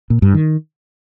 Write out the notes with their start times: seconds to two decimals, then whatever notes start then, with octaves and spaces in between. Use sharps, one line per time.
0.10 A#2
0.22 G2
0.34 D#3